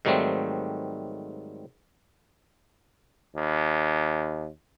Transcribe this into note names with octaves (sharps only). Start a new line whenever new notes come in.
G#2 D#3 F#3 G3 A3 C4
D#2